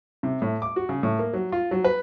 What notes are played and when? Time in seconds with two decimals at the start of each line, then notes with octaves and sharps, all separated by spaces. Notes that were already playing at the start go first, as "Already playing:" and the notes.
0.23 C3
0.42 A2
0.62 D6
0.76 F#4
0.89 C#3
1.03 A2
1.19 A#3
1.33 F#3
1.52 F4
1.71 F#3
1.84 B4